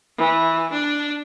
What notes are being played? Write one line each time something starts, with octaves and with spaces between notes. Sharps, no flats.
E3
D4